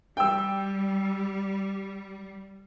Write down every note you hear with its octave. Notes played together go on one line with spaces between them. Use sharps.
G3 G5 E6